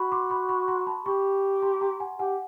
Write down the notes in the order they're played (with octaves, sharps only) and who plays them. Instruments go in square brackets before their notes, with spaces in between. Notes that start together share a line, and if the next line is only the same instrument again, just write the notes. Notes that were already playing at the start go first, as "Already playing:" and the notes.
Already playing: [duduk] F#4 [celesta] B5 C#6
[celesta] C6 D6
B5 C#6
B5 C#6
A#5 C6
A5 B5
[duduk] G4 [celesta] B5 C#6
[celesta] A#5 C6
A#5 C6
F#5 G#5
[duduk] G4 [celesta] F#5 G#5